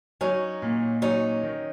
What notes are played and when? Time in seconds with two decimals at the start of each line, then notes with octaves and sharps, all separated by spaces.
0.21 F#3 C#4 D#4
0.62 A#2
1.02 F#3 C#4 D#4
1.43 D#3